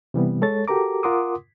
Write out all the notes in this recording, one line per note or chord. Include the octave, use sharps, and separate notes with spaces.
C3 E3 G3 B3
G#3 A4 C#5 A6
F#4 G4 A4 A#4 A#5 D6
F4 A#4 F#5 C6 D6 D#6